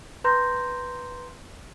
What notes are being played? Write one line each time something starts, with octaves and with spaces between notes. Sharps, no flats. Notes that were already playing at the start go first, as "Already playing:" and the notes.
B4 A#5 C6 G6 A#6